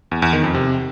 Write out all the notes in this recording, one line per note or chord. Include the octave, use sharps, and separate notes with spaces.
E2
E2
D#3
F2
C3